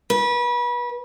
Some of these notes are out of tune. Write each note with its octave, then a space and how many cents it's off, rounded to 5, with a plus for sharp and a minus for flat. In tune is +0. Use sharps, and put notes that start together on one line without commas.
B4 -30